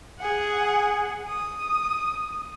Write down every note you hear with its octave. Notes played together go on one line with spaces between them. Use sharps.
G#4 F#5
D#6